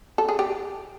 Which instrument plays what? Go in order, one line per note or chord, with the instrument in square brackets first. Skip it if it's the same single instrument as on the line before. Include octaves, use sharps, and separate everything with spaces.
[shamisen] A4
G#4
G4